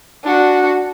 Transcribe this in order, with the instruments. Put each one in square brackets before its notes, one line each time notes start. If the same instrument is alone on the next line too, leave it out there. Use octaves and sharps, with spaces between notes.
[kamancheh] D4 F#4